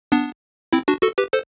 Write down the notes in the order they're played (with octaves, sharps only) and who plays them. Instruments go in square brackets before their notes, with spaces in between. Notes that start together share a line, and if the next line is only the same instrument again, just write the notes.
[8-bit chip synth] B3 D4
C4 E4
D4 F#4
F#4 A4
G4 B4
A4 C5